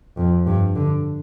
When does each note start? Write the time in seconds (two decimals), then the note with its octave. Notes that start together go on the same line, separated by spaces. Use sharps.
0.17 F2
0.46 G2
0.76 D3